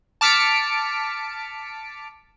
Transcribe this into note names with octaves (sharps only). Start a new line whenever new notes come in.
A5 D6 F6 B6 C#7 D7